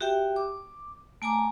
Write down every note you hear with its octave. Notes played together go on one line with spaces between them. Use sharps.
F#4 G4 E5 G5
D6
A3 G#5 A#5 D6